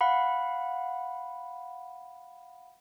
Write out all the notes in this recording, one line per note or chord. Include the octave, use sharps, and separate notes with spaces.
F5 F#5 B5